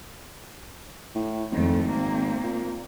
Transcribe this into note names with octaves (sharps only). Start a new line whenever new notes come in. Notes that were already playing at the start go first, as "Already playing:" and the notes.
A2
G#1 F2 A3
A#3 C4
A#2